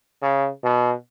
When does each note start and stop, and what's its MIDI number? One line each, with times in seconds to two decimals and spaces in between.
0.22 0.48 49
0.64 0.93 47